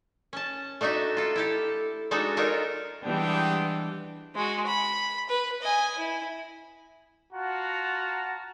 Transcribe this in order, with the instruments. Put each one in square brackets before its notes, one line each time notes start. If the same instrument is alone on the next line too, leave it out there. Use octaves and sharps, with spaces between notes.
[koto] C#4 A5
A3 D4 D#4 F#4 E5
F4 A4
E4 G4 A4
G#3 D4 D#4 F#4 A4
D4 D#4 F4 A4 A#4 C#5
[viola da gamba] E3 G3 D4 [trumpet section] G#3 B3 G5
[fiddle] G#3 F#4
B5
B4
D#5 G#5
E4
[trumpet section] F4 F#4 F#5 A5 A#5